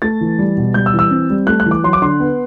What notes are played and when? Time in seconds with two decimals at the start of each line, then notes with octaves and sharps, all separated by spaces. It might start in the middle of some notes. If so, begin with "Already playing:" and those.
0.02 A3 A6
0.21 E3
0.38 G3
0.57 B2
0.74 G3 G6
0.86 E6
0.93 E3
0.99 E6
1.10 C4
1.30 G3
1.47 A3 F#6
1.60 F#6
1.66 E3
1.71 D6
1.84 F#3 C6
1.93 D6
2.02 D3 C6
2.20 B3